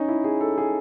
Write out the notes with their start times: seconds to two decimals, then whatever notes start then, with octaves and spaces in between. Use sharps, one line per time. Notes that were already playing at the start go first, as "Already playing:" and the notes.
Already playing: C#4 D#4
0.08 E4
0.24 G#4
0.41 A4
0.58 G#4